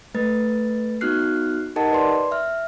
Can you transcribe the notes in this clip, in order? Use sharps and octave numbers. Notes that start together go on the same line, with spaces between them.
A3 B4 A6
B3 D#4 F#4 F6 F#6 C7
D#4 G4 A#4 D#5 F#5 A5
B4 D5 C6
E5 F6